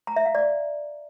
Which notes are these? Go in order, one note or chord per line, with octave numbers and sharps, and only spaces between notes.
A#5
E5
F5
D5